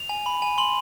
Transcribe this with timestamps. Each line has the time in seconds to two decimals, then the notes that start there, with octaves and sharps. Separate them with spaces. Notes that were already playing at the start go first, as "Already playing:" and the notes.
Already playing: F7
0.09 G#5
0.26 B5
0.42 G#5
0.58 C6 F#7